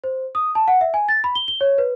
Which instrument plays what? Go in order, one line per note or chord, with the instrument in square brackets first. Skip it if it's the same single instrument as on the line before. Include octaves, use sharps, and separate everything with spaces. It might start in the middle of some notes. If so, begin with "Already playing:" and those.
[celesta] C5
D#6
A5
F#5
E5
G#5
A6
B5
G7
G7
C#5
B4